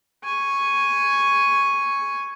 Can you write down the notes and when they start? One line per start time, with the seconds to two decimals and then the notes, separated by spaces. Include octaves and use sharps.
0.24 G#5 C#6